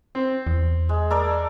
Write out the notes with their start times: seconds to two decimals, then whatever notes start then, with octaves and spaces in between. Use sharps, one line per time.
0.15 C4
0.47 E2
0.89 G#3
1.10 A4 A#4 D5